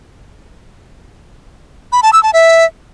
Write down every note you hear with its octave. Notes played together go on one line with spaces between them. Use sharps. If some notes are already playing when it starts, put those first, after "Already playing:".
B5
A5
E6
A5
E5